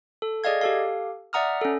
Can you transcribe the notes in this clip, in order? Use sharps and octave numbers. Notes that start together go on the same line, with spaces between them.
A4
G#4 D5 D#5 F5 G#6
G4 A4 F5
D5 E5 F#5 A#5 D#6 F6
C#4 A4